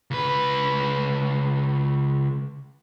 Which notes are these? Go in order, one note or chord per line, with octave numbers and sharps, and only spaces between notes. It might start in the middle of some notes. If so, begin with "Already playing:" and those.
C#2 B4